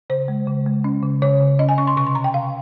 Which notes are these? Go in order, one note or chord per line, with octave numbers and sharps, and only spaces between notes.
C#3 C5
G#3
C#3
G#3
C#4
C#3
C#3 C#5
C#3
C#4 D#5
G#5
C#4 C#6
C6
C3 C#6
C6
C3 A#5
G5
C3 F5